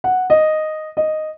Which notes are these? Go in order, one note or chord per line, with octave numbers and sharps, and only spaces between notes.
F#5
D#5
D#5